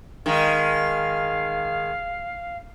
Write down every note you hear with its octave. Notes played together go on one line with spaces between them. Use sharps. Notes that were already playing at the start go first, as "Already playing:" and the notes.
D#3 G#3 F5